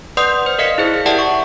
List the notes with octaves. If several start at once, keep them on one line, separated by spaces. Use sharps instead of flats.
B4 D5 F#5 C6 D#6 G6
C5
A#4 D5 D#5 F5 B6 C#7
E4 G#4 C5
G4 A#4 D5 E5 F#5 A5
C#6